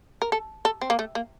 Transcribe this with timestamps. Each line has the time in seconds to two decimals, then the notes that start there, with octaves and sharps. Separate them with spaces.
0.22 A#4
0.32 A4
0.65 A4
0.81 C4
0.90 A#3
0.99 A3
1.15 A#3